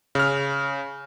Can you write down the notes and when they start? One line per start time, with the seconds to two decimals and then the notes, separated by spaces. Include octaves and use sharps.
0.15 C#3 F6